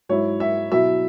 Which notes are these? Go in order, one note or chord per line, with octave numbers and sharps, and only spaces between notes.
G#2 F#3 E4 C#5
E5
B2 F#3 E4 E5